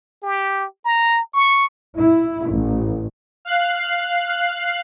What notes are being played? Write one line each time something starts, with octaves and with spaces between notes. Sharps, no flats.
G4
A#5
C#6
E4
A1
F5 F#6 C7